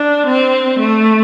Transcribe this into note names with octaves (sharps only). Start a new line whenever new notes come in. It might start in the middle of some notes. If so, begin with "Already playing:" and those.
Already playing: D4
C4
A3